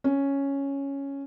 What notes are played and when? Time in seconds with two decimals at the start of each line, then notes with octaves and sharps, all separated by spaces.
0.04 C#4